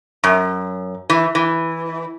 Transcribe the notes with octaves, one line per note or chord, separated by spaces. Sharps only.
F#2
E3
E3